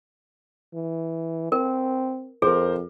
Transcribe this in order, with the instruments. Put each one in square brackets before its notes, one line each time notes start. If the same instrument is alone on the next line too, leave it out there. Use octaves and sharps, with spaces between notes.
[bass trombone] E3
[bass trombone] C4 [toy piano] A#4
[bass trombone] F2 [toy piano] G#4 [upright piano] A#4 C5